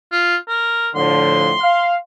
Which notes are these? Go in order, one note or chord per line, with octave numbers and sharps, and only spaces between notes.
F4
A#4
A2 D3 F3 C6
F5